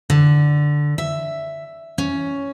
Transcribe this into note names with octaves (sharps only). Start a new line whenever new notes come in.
D3
E5
C#4